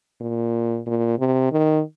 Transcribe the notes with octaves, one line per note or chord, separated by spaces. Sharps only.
A#2
A#2
C3
D#3